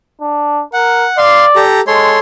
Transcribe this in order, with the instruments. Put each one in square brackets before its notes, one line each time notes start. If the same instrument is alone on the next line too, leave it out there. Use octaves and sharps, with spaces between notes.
[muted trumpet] D4
[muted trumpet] A#4 [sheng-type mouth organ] F#5
[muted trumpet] D5 [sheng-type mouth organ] F5 C6
[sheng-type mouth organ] G4 A4 A#5
[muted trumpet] G#3 [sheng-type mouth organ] A4 C#5 C6